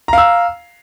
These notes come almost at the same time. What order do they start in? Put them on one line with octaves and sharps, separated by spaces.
A#5 F5 E6